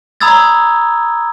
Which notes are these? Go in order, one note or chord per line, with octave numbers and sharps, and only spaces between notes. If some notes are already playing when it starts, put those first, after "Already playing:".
A#5 B5 D#6 E6 G#6 A6